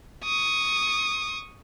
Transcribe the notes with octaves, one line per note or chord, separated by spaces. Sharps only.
C#6 D#6